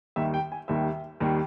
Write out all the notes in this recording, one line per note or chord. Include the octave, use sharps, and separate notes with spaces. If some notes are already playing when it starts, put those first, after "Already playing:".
D#2 D#3 G3 E5
G5
G#5
D#2 D#3 G3 E5
D#2 D#3 G3